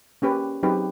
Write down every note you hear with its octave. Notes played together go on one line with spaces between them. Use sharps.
A#3 C#4 G4 B4
F#3 C4 D#4 G4 G#4 B4